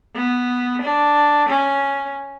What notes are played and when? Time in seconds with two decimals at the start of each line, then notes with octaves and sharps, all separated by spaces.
0.15 B3
0.82 D4
1.49 C#4